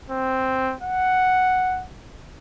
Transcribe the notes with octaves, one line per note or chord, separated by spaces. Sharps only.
C4
F#5